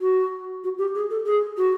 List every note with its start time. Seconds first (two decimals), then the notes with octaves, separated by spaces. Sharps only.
0.01 F#4
0.64 F#4
0.78 G4
0.95 G#4
1.10 A4
1.26 G#4
1.57 F#4